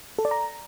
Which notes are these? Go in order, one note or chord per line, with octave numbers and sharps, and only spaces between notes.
A4
D5
A#5